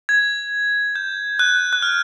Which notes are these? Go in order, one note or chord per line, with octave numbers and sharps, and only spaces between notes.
G#6
G6
F#6
F#6
F6